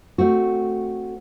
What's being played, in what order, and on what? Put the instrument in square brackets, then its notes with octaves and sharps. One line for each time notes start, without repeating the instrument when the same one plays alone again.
[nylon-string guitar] A3 C4 F#4